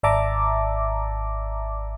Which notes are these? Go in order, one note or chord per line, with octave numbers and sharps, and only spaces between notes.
G#1 D5 E5 A5 A#5 D6